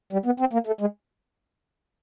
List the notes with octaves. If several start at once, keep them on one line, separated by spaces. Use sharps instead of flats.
G3
B3
C4
A#3
A3
G#3